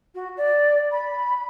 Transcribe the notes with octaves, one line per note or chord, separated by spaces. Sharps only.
F#4
D5
B5